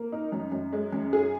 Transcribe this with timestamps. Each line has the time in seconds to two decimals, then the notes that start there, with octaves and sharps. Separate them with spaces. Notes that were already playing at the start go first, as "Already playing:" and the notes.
Already playing: A#3
0.12 D#4
0.32 F#2
0.52 F#2
0.73 G#3
0.93 F#2
1.13 G#4